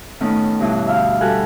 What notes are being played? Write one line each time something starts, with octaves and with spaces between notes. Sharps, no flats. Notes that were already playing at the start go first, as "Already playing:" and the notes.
A2 D#3 B3 C#4
G2 B2 E3 E4
D2 E5 F5
G3 F#4 G4 A4 G#5 F#6